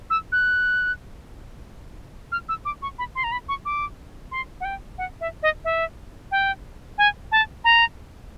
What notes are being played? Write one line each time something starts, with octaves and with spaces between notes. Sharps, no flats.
E6
F#6
F6
E6
D6
C#6
B5
C6
A#5
B5
C#6
D6
C6
F#5
G5
F#5
E5
D#5
E5
G5
G#5
A5
A#5